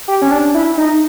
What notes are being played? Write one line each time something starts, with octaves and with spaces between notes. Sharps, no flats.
G4
C#4
D4
E4
D#4